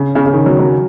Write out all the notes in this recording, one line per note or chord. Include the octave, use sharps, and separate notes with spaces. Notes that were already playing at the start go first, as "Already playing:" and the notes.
Already playing: C#3
C#3
C#3
D#3
F#3
F#3